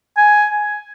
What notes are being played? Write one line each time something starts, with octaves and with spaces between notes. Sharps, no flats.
G#5